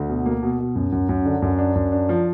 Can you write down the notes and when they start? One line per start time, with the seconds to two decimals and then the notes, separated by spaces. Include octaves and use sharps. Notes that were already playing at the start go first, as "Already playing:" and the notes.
Already playing: D2
0.09 B2
0.26 A#3
0.43 B2
0.59 B2
0.76 F#2
0.92 F#2
1.09 F#2
1.25 D3
1.42 F#2
1.58 D4
1.75 F#2
1.92 D4
2.09 F3